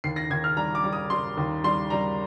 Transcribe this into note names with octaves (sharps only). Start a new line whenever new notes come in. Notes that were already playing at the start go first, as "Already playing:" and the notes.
D#2 C7
A#6
D#2 G#6
F6
G3 A#5
D6
G3
D#6
G3 C6
D#2
G3 C6
G3 A#5